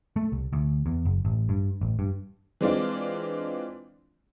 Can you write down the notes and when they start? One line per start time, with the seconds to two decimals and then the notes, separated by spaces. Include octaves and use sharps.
0.16 A3
0.32 C2
0.53 D2
0.86 E2
1.05 F#1
1.25 A1
1.49 G2
1.81 A1
1.99 G2
2.61 E3 G#3 C4 D4 F4